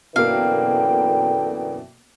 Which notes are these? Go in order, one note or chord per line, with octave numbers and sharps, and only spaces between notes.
F#2 B2 D3 E3 A#3 A4 F5 G5